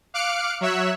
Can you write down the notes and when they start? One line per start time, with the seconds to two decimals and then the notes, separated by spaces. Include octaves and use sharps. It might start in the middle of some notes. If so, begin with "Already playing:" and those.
0.14 F5 D6 F6 F#6 C#7 D7
0.61 F#3 C#5 E5 E6 F#6